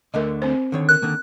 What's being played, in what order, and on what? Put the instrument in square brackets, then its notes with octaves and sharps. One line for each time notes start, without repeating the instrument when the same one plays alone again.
[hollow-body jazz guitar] D2 D3 A3 [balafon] A#4 D#5
[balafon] C4 C5
[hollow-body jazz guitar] D3 D#3 C#5
[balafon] A#4 [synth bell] F#6
[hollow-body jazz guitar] D3 D#3 A#3